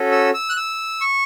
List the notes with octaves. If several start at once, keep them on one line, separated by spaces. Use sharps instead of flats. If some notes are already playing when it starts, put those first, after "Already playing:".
Already playing: C#4 F#4 A4
E6
E6
F#6
E6
C#6